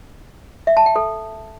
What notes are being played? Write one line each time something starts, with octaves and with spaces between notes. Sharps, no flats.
E5
A5
G5
A4